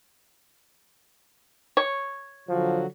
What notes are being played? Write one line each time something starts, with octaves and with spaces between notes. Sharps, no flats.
C#5
D3 F3 F#3 F#4